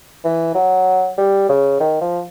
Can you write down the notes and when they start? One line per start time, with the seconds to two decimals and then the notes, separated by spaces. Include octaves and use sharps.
0.24 E3
0.55 F#3
1.18 G3
1.49 C#3
1.80 D#3
2.01 F3